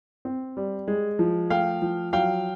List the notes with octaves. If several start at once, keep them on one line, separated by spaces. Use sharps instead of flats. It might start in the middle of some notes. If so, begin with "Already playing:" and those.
C4
G3
G#3
F3
A3 F5 G5
F3
F#3 F5 G5